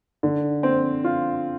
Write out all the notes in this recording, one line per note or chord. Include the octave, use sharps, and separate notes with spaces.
D3
C4
F4